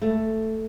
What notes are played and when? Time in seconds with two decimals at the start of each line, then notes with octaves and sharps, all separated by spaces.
0.02 A3